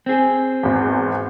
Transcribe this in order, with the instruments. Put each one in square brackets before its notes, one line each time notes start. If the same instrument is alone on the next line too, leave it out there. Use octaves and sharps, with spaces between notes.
[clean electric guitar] C4 G#4
[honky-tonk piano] G#1 E2